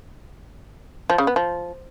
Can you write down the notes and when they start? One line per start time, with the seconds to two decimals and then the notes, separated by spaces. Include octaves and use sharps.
1.10 F3
1.18 C#3
1.27 B3
1.36 F3